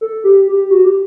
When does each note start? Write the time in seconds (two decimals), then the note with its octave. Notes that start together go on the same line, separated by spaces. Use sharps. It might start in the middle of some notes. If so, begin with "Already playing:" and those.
0.01 A4
0.24 G4
0.48 G4
0.70 F#4
0.84 G4